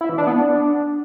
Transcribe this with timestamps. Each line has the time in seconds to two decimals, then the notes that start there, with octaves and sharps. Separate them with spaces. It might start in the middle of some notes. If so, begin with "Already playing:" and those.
0.01 E4
0.09 E3
0.18 D4
0.27 B3
0.36 D4